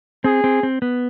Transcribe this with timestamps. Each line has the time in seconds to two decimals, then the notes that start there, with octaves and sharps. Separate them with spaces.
0.24 C4 G#4
0.44 C4
0.63 C4
0.82 B3